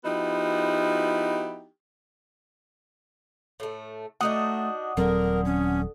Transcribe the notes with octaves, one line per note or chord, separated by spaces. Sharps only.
F3 B3 D#4 E4 F#4 G4
A2 A3
A3 D4 D#4 F#4 F#5 D#6
D#1 D3 F#3 C4 A#4
C#4